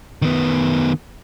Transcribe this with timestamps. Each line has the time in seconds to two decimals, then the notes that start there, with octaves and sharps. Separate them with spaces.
0.22 D#3 B3